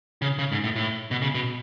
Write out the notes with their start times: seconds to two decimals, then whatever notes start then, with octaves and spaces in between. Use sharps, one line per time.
0.22 C#3
0.39 C#3
0.52 G#2
0.64 A2
0.76 A2
1.11 B2
1.22 C#3
1.35 B2